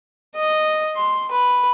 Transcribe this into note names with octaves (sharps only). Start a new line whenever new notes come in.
D#5
C6
B4